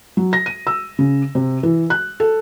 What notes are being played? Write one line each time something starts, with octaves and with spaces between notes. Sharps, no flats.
F#3
A#6
D#7
E6
C#3
C3
E3
F#6
A4